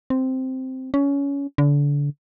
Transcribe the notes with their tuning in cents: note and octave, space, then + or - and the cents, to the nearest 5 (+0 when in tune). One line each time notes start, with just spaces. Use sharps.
C4 -5
C#4 +20
D3 -30